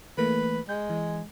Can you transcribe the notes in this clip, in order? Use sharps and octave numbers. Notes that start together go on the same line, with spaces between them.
E3 A3 A#3 B4
G#3 G6
E3